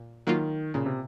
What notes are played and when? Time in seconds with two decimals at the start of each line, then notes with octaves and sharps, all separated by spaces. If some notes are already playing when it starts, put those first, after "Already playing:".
Already playing: A#2
0.27 D#3 F#3 A#3 F4
0.74 A#2 C#3
0.86 C3